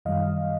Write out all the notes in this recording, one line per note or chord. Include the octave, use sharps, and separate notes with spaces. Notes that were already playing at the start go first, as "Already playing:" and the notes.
F#2 D#3 G3 D#5 F5